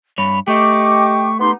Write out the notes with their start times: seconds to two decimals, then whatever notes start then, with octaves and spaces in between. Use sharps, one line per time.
0.18 G2 C#5 B5
0.48 A3 G4 D#5 C#6 D6
1.40 B3 D#4 G4 C6